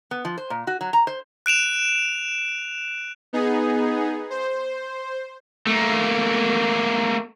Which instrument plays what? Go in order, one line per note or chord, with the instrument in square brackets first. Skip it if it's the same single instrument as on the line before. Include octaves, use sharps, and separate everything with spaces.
[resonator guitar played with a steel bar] B3
F3
C5
A#2
F#4
F#3
A#5
C5
[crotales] F#6 D7 E7 F7
[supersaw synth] B3 D#4 G#4
C5
[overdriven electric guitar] A3 A#3